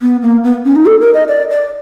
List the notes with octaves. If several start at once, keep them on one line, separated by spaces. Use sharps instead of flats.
B3
A#3
B3
C#4
D#4
A4
A#4
D#5
D5
D5